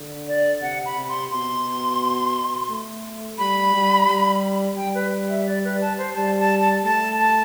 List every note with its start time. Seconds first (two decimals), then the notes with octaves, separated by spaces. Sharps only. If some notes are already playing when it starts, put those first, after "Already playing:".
Already playing: D3
0.28 D5
0.62 C3 F#5
0.85 B5
0.96 C3
1.08 C6
1.31 B2 C6
2.70 A3
3.38 G3 B5
3.74 G3
4.08 G3
4.77 G3 G5
4.95 B4
5.29 E5
5.47 D5
5.65 B4
5.81 A5
5.98 C5
6.15 G3 A5
6.39 A5
6.61 A5
6.85 A3 A5
7.20 A5